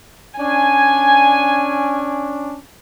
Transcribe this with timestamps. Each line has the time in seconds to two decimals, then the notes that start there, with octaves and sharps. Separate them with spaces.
0.39 C#4 D4 G#5